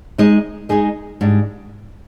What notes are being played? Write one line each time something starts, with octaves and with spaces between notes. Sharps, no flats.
G#3 D#4 G#4 D#5
G#3 D#4 G#4 D#5
G#2 G3 D4